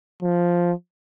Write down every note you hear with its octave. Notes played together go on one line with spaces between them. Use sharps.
F3